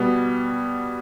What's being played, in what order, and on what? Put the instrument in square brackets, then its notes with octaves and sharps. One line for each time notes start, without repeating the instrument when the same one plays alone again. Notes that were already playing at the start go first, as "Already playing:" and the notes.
Already playing: [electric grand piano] B2 G3 B3